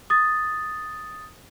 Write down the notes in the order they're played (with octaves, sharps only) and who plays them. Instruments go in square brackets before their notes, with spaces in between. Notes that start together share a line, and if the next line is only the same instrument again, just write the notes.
[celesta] D#6 A6